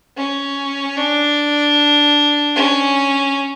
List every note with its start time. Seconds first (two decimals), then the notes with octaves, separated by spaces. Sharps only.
0.17 C#4
0.97 D4
2.56 C#4